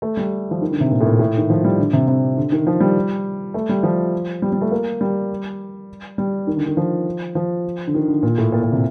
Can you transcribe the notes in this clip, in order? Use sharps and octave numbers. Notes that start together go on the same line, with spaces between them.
A3
G3
F3
D#3
D3
C3
A#2
A2
A#2
A2
D#3
F3
G3
D3
C3
C3
D3
D#3
F3
G3
A3
G3
F3
G3
G3
A3
A#3
G3
G3
D#3
D3
D#3
F3
F3
D3
D#3
D3
A#2
A2
A#2
A#2
C3